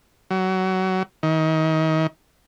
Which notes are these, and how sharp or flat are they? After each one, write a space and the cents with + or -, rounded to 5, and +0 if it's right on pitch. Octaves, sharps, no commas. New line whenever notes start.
F#3 +25
D#3 +30